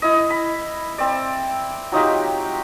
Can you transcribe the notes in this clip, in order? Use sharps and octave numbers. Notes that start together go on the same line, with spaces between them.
E4 D#5
B5
C4 D5
F#3 D#4 F4 G4